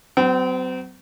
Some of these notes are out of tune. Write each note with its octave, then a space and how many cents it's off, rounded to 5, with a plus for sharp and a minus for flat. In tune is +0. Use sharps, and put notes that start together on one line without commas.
F#3 +30 C4 -35